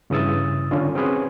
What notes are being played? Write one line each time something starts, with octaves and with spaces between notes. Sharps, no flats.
G2 C#3 E3 D#6 E6 A6
D3 C#4 D4 F4
C4 C#4 F#4 G#4 B4 C5